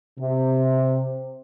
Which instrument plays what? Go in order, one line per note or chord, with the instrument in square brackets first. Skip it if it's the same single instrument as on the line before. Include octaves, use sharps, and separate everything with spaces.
[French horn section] C3